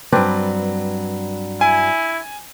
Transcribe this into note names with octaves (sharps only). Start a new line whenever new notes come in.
G2 F#3 C4 D4 B4
E4 G#5